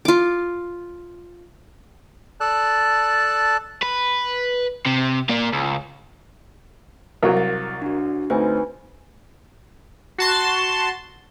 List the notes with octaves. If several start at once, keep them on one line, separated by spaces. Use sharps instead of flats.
F4 D6
A4 D5 A5 F#6
B4
C3
A#3 D5
C#2
C2 F#3 A#4 F5 C#6
A6
D4 F#4
D2 C4 D#4 B4 G#5
F#4 A5 C6